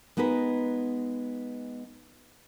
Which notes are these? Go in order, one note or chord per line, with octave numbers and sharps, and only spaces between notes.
G#3 B3 D#4 F#4 B4